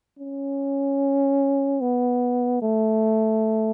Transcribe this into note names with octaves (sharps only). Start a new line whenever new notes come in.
C#4
B3
A3